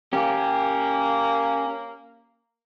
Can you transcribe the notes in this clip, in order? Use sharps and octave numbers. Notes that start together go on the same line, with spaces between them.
A#3 C#4 G4